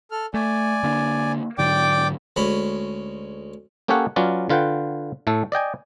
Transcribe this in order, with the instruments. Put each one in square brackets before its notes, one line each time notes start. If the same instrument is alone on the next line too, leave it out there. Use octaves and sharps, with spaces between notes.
[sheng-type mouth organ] A4 F6
[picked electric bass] A3 [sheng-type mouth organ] D5 G#5
[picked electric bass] D3 A#3 D4
[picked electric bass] G#2 D3 F#3 [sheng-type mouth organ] D5 G5 D6
[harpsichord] D2 G#3 C#4 B5
[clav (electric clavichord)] A#3 C#4 G4 A4 C#5 F#5
F#3 C#4 F4 B4 D5
D3 F4 B4 F#5 G5
A2 A3 A4
D5 D#5 G5 G#5